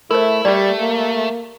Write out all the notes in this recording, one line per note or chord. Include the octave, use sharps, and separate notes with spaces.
A3 E4 A#4 C5
G3 A3 G4 D5
A#3